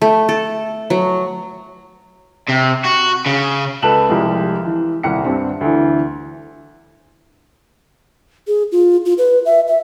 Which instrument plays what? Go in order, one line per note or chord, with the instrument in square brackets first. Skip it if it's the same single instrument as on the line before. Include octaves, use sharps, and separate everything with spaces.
[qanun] A3
A4
F#3
[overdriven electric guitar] C3
F#4
C#3
[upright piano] C#2 A4 B4 A5 E7 F#7
C2 F3 G3 G#3
E3
D#1 C2 F#5 C#7
G2 C4 D4
D2 D3 E3
[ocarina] G#4
F4
F4
B4
E5
E5